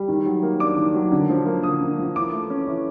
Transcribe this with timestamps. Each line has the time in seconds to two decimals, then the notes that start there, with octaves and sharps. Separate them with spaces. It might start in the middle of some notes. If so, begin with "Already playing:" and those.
Already playing: G3
0.08 D#3
0.26 F#3
0.43 A#3
0.60 D4 D6
0.77 D#3
0.95 F#3
1.12 D3
1.29 F3
1.46 A#3
1.63 D3 D#6
1.81 D3
1.98 F3
2.16 E3 D6
2.33 A3
2.50 C#4
2.67 E3